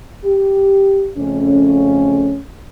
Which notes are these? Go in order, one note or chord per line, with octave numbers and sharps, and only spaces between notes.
G4
F2 C#3 A3 C#4